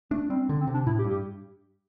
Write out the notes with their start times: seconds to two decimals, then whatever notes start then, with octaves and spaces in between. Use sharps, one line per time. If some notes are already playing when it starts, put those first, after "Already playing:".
0.11 A3 D4
0.29 G3 C4
0.49 D3
0.61 C4
0.67 C3
0.74 D4
0.87 A2 E4
0.99 G4
1.05 G2
1.10 G4